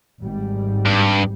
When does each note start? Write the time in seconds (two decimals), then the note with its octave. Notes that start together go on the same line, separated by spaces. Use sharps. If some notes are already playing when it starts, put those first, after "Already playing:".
0.22 G#1 G#2 G3
0.86 G2